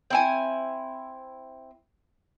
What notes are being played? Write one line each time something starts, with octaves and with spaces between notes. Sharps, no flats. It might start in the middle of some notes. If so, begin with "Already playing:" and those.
C4 E4 G#5